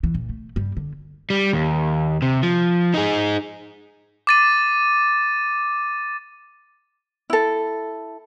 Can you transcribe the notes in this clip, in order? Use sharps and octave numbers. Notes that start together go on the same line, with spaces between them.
D2 E3
A#2
A3
G2 G3
D3
G3
D#2
C3
F3
D#4 G#4
D6 A6 D#7
E4 A4